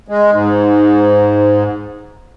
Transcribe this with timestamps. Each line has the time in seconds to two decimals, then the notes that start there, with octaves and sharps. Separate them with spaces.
0.08 G#3
0.32 G#2